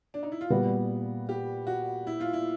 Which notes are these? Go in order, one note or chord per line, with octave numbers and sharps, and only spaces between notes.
D4
D#4
E4
F4
A#2 G3 B3 F#4
G4
F#4
E4
F4
E4